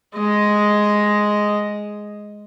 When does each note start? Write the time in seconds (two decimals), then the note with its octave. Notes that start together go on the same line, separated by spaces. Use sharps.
0.17 G#3 D#5